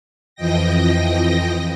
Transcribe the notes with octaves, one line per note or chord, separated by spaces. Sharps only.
F2 E3 F3 D#5 G5 A#6